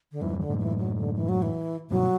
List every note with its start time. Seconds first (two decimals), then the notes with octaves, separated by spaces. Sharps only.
0.12 D3
0.21 E2 G2 E3
0.40 D3
0.49 F#2 A2
0.60 E3
0.79 F#3
0.97 D3
1.16 E3
1.29 F#3
1.42 E3
1.90 G2 B2 F#3